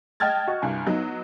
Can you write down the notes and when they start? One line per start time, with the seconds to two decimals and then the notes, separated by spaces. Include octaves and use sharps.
0.20 D#5 G5 A5 F6 G#6 A6
0.47 F#4 D#5 C#6
0.62 C2 G2 G#5
0.86 F#3 B3 D#4